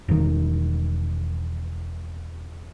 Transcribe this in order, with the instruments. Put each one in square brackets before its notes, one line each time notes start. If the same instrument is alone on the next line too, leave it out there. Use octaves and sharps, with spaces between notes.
[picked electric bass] E1 D#3